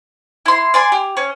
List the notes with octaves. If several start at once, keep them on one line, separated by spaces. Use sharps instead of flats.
E4 C6
D5 G#5 C6
G4
C#4